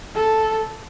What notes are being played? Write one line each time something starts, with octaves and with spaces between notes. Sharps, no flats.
A4